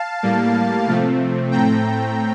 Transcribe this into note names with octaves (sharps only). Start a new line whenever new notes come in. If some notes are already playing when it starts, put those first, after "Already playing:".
Already playing: F5 A5
A2 G3 A#3
C3 F3 A3 C4
A2 A3 C4 G5 A#5